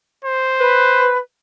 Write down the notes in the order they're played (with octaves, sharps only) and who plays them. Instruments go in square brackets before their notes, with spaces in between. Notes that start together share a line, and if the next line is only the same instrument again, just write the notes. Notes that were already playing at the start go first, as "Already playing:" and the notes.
[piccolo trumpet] C5
[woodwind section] B4